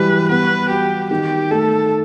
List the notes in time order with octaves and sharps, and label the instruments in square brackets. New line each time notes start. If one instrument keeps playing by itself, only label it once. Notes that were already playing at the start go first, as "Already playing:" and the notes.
Already playing: [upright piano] E3 F#3 G3 [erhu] B4
[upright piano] B3 [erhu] B4
[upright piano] F#4 [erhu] G4
[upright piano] D#3 [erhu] G4
[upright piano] A3 [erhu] A4